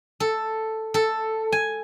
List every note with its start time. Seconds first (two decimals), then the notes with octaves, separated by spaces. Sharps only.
0.20 A4
0.94 A4
1.52 G#5